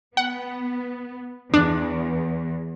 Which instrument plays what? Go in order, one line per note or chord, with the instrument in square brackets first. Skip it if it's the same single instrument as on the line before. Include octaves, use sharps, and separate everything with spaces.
[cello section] B3 [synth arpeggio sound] F#5
[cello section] E2 [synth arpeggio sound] D4